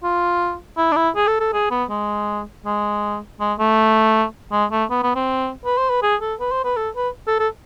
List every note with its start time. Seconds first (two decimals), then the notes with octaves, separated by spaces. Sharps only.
0.03 F4
0.77 E4
0.92 D4
0.96 E4
1.16 G#4
1.27 A4
1.40 A4
1.53 G#4
1.71 B3
1.89 G#3
2.66 G#3
3.40 G#3
3.59 A3
4.52 G#3
4.71 A3
4.90 B3
5.03 B3
5.15 C4
5.65 B4
5.78 C5
5.90 B4
6.03 G#4
6.21 A4
6.40 B4
6.52 C5
6.64 B4
6.76 A4
6.96 B4
7.27 A4
7.39 A4